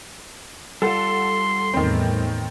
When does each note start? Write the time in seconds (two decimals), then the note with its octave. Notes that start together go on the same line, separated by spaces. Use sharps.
0.82 G3 F4 A4 F#5 C6
1.74 E2 A2 D#3 C4